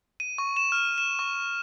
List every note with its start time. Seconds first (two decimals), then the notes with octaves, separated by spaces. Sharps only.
0.20 D#7
0.38 C#6
0.57 E7
0.72 F6
0.98 E7
1.19 C#6